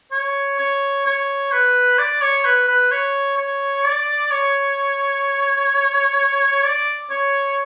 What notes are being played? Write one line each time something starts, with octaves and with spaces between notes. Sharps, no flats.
C#5
C#5
C#5
B4
D5
C#5
B4
B4
C#5
C#5
D5
C#5
D5
C#5